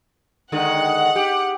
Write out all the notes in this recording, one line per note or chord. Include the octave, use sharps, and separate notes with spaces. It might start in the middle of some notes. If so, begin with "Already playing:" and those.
D3 D#3 G#3 F#5
G4